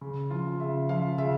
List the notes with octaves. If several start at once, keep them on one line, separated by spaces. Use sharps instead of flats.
C#3
F3 F4
C#3 E5
F3 F5
C#3 E5